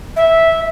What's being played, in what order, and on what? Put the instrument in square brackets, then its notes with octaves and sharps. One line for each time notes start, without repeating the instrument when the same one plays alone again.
[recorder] E5